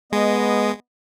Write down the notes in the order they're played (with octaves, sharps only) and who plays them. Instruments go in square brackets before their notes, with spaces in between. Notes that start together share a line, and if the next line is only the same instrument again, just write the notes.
[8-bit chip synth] G#3 [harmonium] B3 D#5